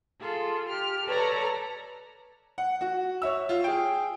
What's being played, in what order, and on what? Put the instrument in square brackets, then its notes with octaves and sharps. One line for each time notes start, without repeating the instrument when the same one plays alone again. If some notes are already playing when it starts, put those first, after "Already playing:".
[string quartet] F4 G#4 A4
G4 F6
A4 B4 C#5 D5 A#5
[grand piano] F#5
F#4
C#5 E5 E6
F4
G#4 G5